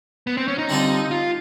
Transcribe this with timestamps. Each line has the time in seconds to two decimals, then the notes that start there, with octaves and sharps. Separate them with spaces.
0.27 B3
0.37 C4
0.48 C#4
0.58 D#4
0.69 D3 G3 C4 F4 A4
1.11 F4